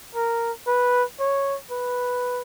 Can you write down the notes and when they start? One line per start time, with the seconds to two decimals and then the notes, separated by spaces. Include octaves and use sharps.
0.15 A#4
0.67 B4
1.20 C#5
1.71 B4